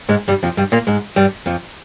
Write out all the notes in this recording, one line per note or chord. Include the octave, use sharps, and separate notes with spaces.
G#2 G#3
G2 G3
F2 F3
G2 G3
A#2 A#3
G#2 G#3
G2 G3
F2 F3